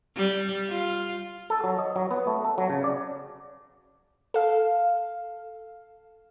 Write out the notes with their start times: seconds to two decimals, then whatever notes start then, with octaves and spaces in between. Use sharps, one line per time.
0.17 G3
0.69 F4
1.50 A4
1.64 F#3
1.79 D#5
1.96 F#3
2.11 B3
2.27 A3
2.44 A4
2.58 F#3
2.70 C#3
2.84 D5
4.34 A4 F5